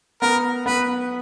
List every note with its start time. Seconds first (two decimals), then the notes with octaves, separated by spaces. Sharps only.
0.22 B3 A#4
0.66 B3 B4